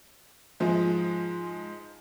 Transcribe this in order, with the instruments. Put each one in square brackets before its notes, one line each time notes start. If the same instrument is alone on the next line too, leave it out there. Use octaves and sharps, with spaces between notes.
[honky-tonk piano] G#2 F3 G#3